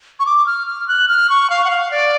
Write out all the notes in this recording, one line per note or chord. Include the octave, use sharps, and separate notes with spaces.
C#6
D6
F6
F6
F#6
F6
C#6
F5
F#5
F5
D5